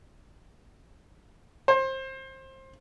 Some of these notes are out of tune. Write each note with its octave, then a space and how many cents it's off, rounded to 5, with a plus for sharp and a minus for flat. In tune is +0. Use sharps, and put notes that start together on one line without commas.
C5 +25